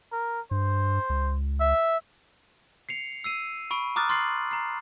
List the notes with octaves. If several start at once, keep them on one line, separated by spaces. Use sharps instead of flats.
A#4
G2 C5
C#2
E5
C7 C#7 F7
E6 C7 D#7
B5 C#6 D7
A#5 D6 D#6 F6 F#6 A6
C6 F6 A6 C7 F#7
A#5 C7